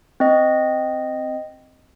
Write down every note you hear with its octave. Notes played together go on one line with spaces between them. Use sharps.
C4 D#5